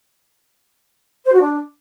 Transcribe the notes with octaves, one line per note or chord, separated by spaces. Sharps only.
C5
F#4
D4